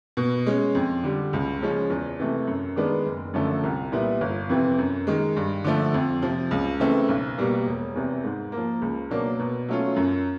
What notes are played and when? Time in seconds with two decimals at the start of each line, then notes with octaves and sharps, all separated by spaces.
0.17 B2
0.46 G#3 C#4
0.75 F2
1.04 D3 G3
1.33 C#2
1.61 C#3 F3 G#3 C#4
1.90 E2
2.20 C3 E3 A3
2.47 F#2
2.76 D#3 G#3 B3 D4
3.06 F#1
3.34 F#2 D3 F3 A3
3.63 C2
3.92 A#2 G3 B3 E4
4.21 G1
4.49 F2 C3 E3
4.79 F#2
5.07 D#3 G#3
5.37 G2
5.64 D3 F3 A3
5.94 F2
6.22 C3 F3
6.51 C#2
6.80 C#3 E3 A3 C4
7.09 B1
7.38 B2 G3 A#3
7.67 E1
7.95 E2 C3 E3
8.24 G#2
8.52 A#3
8.58 F3
8.81 C#2
9.10 B2 F#3 A#3 D4
9.39 B2
9.69 F#3 A3 C#4 F4
9.96 F#2